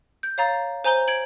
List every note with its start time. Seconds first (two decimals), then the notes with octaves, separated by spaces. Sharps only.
0.23 G6
0.38 C#5 F5 A#5 A6
0.84 C5 G#5 A#5 G6 G7
1.08 G#6 D7 F#7